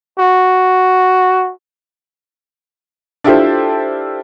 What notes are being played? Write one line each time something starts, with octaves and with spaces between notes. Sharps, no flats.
F#4
D4 E4 F4 G4 A4 C5